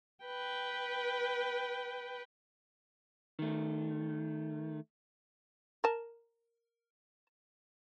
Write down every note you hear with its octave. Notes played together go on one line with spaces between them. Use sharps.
B4 G5
D#3 A3
A#4 A5